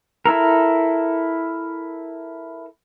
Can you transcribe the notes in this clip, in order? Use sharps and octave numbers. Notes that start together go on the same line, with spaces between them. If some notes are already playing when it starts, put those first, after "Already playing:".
E4 A4 A#4